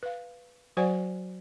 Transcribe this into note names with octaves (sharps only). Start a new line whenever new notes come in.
B4 F5
F#3 F#4 C5 D5 F#5 G#5